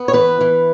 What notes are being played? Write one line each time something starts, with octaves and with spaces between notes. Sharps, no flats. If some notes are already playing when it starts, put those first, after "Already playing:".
Already playing: B3
C#5
E3 B4
E3